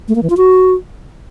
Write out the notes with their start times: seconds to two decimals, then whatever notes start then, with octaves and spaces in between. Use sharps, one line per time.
0.08 A3
0.15 A#3
0.23 E3
0.30 F4
0.37 F#4